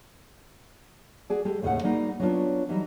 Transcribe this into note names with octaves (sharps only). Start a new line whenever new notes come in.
F#4 G#4 D5
G#3 G4 A4
D#2 A2 C#3 A4 A#4 F#5
G3 G#3 A#3 D#4 F#4
F#3 G3 B3 C#4 D4 F4
E3 F#3 G3 D#4